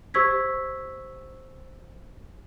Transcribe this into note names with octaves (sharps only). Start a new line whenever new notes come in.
G4 C5 C#6 E6 G#6 B6